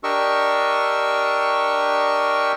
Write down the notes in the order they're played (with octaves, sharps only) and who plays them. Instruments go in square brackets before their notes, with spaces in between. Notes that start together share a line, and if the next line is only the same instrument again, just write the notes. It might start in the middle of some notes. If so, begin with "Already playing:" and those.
[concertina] D4 G4 A#4 D#5 C#6 E6